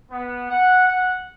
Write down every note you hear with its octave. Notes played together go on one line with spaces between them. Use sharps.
B3
F#5
F#5